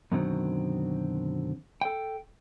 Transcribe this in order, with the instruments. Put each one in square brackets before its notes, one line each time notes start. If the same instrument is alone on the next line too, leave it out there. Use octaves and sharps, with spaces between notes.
[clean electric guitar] F#2 B2 D3 D#3 F#3 C4
A4 G5